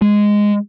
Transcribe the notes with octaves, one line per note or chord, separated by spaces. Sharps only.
G#3